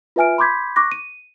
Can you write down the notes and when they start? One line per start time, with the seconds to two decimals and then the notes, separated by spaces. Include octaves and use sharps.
0.16 F4 B4 E5 G#5 F6 D7
0.38 B5 C6 D6 G6 G#6 B6
0.76 C#6 D6 F#6 A#6
0.92 D#7